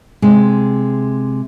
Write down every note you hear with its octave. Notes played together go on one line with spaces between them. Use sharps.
C3 G#3